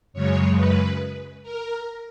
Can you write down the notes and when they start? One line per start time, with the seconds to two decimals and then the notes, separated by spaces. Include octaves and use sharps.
0.13 F#2 C#3 G#3 C#5
0.56 B4
1.43 A#4